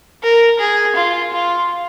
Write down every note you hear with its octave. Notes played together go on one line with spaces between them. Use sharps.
A#4
G#4
F4
F4